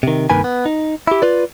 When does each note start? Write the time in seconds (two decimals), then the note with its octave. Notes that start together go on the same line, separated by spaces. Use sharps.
0.03 C3 D#3
0.30 C2 G2 D#3 A#3 B4 G#5
0.44 B3
0.66 D#4
1.07 E4 G4
1.22 F4 B4 D5